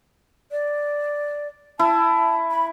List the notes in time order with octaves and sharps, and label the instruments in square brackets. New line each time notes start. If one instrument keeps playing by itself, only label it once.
[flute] D5
[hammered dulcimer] E4 [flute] A5
[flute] B5